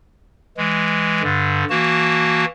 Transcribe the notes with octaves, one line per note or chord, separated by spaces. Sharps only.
E3 G#3
G2 D3
E3 A#3 F#4 A5